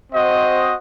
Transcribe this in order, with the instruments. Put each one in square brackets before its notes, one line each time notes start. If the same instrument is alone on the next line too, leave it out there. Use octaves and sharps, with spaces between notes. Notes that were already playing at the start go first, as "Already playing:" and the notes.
[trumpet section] C4 F#4 C5 D#5 F#5